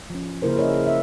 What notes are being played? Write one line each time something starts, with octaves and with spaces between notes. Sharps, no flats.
F3 C#4
C#3 A#3 E4 A#4 C5
G#4 A#4 C#5 D#5 E5
E5